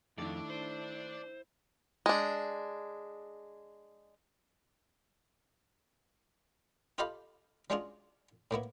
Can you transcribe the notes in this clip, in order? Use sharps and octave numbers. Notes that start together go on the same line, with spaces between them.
F2 D#3 A3 D4 E4 D5
C5
G#3 D4
F4 G4 A4 D#5 F5 B5
F#3 G#3 C#4 D4 F4 G#4
A2 A#3 B3 E4